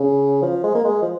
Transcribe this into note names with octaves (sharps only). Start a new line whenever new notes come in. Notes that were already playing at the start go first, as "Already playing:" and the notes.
Already playing: C#3
F3
G#3
A#3
G#3
F3